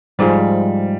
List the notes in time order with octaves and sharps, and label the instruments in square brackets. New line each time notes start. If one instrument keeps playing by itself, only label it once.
[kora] G#2 F3 G#3 [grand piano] G3